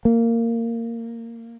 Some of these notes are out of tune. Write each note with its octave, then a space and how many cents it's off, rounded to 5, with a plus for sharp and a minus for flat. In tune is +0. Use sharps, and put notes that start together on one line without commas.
A#3 -15